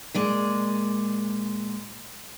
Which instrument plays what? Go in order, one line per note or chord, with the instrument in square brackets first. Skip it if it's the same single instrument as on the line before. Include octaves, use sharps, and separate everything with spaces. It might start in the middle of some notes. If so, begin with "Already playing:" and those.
[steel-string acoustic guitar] A#2 G#3 D5